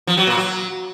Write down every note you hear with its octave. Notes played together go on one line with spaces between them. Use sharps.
F3
F#3
A#2
F#3